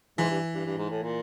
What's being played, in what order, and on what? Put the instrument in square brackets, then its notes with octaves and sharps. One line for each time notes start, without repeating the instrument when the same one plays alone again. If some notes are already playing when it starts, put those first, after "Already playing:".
[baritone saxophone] G#2 [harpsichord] E3
[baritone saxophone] G2
G2
G2
G#2
A2
A#2